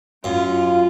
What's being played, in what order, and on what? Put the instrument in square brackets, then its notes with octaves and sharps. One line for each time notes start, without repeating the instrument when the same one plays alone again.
[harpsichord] F#2 [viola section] F4 [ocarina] F5